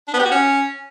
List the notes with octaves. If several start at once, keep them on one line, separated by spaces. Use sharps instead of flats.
D4
B3
G4
F#4
C#4